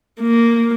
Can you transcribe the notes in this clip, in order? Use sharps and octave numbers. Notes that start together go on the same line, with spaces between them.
A#3